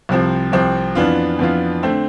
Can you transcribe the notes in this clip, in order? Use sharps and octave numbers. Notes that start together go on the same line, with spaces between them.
C2 C3 F3 C4
C2 C3 F3 C4
F2 E3 B3 D4 F4
F2 E3 B3 D4 F4
D3 A3 C4